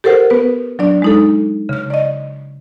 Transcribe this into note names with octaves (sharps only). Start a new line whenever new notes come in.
G4 A4 A#4 C5 F#5
B3 B4
F#3 D4 D5
G#3 D#4 A4
C#3 F6
D5 D#5